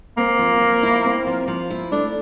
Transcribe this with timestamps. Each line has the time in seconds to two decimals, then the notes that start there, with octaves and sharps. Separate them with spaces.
0.18 A#3 C4
0.39 F3
0.61 F3
0.83 E4
1.05 C4
1.27 F3
1.48 F3
1.70 E4
1.92 A3 D4